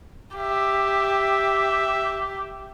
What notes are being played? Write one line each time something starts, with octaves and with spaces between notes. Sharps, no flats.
G4 E5